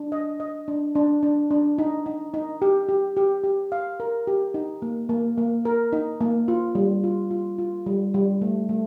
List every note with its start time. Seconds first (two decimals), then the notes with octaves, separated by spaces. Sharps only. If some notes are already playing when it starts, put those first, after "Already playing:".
Already playing: D4
0.12 D#5
0.40 D#5
0.68 D4
0.95 D4
1.23 D4
1.51 D4
1.78 D#4
2.06 D#4
2.34 D#4
2.62 G4
2.89 G4
3.17 G4
3.44 G4
3.72 F5
4.00 A#4
4.27 G4
4.54 D#4
4.82 A#3
5.09 A#3
5.38 A#3
5.65 A#4
5.93 D#4
6.21 A#3
6.48 F4
6.75 G3
7.04 F4
7.31 F4
7.58 F4
7.86 G3
8.14 G3
8.42 A3
8.69 A3